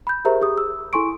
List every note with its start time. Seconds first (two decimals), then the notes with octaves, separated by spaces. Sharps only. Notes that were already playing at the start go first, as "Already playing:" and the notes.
0.07 B5 G6
0.25 G4 G#4 A#4 C5 E5 A#5
0.41 G4 G#4 D#6
0.58 E6
0.93 E4 A4 G#5 C6 C#6 D7